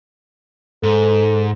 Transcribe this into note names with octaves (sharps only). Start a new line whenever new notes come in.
G#2 A4